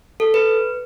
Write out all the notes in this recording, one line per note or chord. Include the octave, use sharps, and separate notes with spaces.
A4
B4